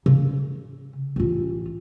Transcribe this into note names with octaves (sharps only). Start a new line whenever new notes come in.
C#3
A1 F4